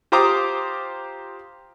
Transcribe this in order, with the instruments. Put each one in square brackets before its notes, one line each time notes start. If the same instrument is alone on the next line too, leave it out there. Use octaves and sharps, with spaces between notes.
[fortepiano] F4 G4 C5 A#5 D6 D#6